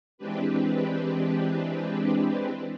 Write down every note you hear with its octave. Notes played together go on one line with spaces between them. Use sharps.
E3 G#3 C4 D4 G4 B4